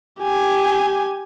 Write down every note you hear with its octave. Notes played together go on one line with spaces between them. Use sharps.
G4 G#5